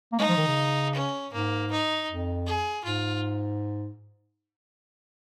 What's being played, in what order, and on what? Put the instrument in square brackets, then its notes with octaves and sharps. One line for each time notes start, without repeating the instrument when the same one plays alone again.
[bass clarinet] A#3
[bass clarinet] G#3 [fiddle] D#4
[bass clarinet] F3
D#3
C#3
[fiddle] C#4
[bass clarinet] G#2 [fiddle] A#3
[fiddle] D#4
[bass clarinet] F2
[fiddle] G#4
[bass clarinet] G#2 [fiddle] F4